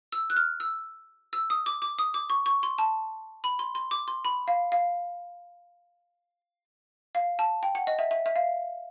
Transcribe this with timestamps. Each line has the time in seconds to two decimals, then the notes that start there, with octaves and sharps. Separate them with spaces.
0.12 E6
0.30 F#6
0.37 F6
0.60 E6
1.33 E6
1.50 D#6
1.66 D6
1.82 D6
1.99 D#6
2.14 D6
2.30 C#6
2.46 C#6
2.63 C6
2.78 A5
3.44 B5
3.59 C6
3.75 C6
3.91 D6
4.08 C6
4.25 B5
4.48 F5
4.72 F5
7.15 F5
7.39 A5
7.63 G5
7.75 F#5
7.87 D#5
7.99 E5
8.11 E5
8.26 E5
8.36 F5